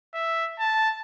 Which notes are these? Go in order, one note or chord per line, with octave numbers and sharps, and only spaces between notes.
E5
A5